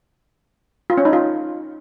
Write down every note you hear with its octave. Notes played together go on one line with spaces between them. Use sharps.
F4
C#4
D#4
F4